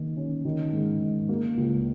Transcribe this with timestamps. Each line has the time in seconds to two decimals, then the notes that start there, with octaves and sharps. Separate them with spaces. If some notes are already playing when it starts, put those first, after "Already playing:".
Already playing: D#3 A#3
0.17 C#4
0.45 D#3
0.73 G#2
1.01 G#2
1.29 A#3
1.57 C#2